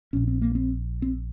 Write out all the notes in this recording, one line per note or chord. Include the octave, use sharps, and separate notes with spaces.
A#1 A#2 C#4
C4
A#3
C4
C4